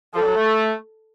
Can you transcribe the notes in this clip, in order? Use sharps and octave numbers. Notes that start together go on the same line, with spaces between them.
F3 A4
G3
F#3
A3